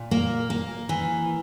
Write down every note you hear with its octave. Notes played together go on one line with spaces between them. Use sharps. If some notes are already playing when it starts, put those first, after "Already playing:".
Already playing: A#2
A#3
A#3
E3